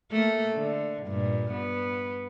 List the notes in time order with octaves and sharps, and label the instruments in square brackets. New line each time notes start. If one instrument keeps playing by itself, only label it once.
[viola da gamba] A3 A#3 A4
D3
G2 A#2
B3